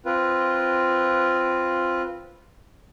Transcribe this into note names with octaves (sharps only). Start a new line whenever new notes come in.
C4 F4 B4